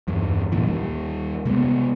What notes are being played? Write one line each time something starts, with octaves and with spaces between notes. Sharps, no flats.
E2 G2
G#1 A#2 E3
D#2 G3
C3 G#3 A#3 B3